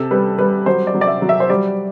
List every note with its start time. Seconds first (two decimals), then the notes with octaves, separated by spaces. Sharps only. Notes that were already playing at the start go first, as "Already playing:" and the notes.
Already playing: C3 A4
0.11 G3 B4
0.38 G3 B4
0.66 F#3 C5
0.87 D5
0.94 F#3
1.01 D5
1.07 E5
1.22 F#3
1.29 E5
1.40 C5
1.50 G3 D5